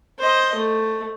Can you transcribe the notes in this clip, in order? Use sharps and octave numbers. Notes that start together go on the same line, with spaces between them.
C5 D#5
A3